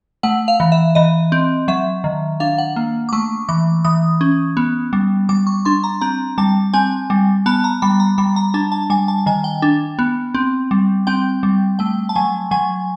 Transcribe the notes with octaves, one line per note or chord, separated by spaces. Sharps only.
A3 F#5
F5
E3
E5
E3 D#5
C4
F#3 E5
D#3
D4 F5
F#5
A#3
D6
A3 C#6
E3 D6
E3 D#6
C#4
B3
G3
G3 D6
C#6
D4 C6
A#5
C4 A#5
G3 A5
C4 G#5
G3
B3 A5
A#5
G3 B5
A#5
G3 B5
A#5
D4 A5
A5
G3 G#5
A5
D#3 G#5
G5
D4
B3
C4
G3
C4 G5
G3
A3 G5
A5
F#3 G#5
F#3 G#5